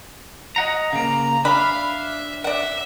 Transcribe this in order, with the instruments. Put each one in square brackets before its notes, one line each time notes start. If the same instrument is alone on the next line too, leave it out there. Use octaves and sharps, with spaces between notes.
[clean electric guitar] D#5 F#5 A#5
[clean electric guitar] C#3 A#3 [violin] A#5
[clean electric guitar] D4 [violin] E5 F5 [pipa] B5
[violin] E5
[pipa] D5 F#5 [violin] E5